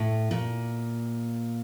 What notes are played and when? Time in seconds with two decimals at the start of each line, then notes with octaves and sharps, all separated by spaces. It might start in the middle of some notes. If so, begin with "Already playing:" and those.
Already playing: A2
0.31 A#2